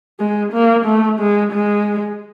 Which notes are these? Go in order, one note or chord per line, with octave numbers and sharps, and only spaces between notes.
G#3
A#3
A3
G#3
G#3